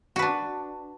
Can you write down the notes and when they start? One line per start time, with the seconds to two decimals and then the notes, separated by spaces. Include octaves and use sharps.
0.16 F#4
0.19 B4
0.22 D4